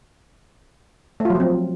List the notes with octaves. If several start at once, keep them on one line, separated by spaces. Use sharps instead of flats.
F3 F#3 A3 C4 F4